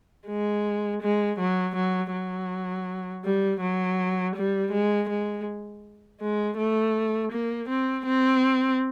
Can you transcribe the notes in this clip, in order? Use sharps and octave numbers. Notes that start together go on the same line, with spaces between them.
G#3
G#3
F#3
F#3
F#3
G3
F#3
G3
G#3
G#3
G#3
A3
A#3
C4
C4